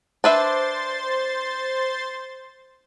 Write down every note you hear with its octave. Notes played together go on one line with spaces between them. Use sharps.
D4 B4 C5 E5 C6 A6